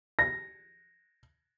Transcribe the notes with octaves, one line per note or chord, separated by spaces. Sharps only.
A#6